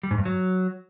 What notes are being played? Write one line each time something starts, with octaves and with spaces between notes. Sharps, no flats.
G3
G#2
G2
F#3